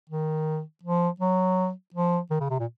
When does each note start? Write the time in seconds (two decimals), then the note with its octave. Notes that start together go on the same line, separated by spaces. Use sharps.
0.10 D#3
0.83 F3
1.20 F#3
1.94 F3
2.31 D#3
2.40 C#3
2.50 C3
2.59 A#2